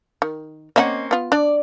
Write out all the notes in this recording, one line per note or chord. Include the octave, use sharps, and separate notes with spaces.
D#3
A#3 C4 C#4 D#5 E5 F#5
B3 F4
D4 D5